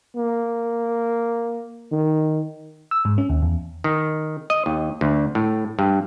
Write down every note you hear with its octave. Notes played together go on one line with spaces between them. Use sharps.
A#3
D#3
E6
G#2
C#4
D#2
E2
D#3
D#5
D#2
D2
A2
G2